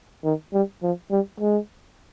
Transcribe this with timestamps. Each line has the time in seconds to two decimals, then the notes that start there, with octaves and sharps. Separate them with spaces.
0.24 D#3
0.53 G3
0.83 F3
1.11 G3
1.40 G#3